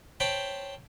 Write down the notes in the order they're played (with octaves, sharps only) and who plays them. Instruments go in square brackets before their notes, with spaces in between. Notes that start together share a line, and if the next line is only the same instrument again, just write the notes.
[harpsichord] C5 C#5 G5 A5 B5